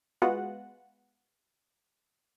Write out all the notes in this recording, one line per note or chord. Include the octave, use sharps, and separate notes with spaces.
G#3 B3 F4 F#4 F#5